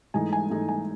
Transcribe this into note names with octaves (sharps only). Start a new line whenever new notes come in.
G#2 E3 A3 D#4 G#5
G#5
G#2 E3 A3 D#4
G#5